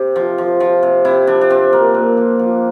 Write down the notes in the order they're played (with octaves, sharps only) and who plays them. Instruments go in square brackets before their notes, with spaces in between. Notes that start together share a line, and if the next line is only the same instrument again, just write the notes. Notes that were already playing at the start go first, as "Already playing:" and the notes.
Already playing: [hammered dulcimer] C3 G4
F3
F3
F3
C3
C3 E4
F3 D4
D4
C3 C4
A#2 A#3
A#2
F3
F3